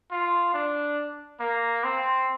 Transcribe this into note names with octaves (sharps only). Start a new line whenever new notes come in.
F4
D4
A#3
C4